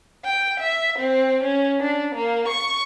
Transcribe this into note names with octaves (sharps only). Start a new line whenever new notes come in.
G5
E5
C4
C#4
D4
A#3
C#6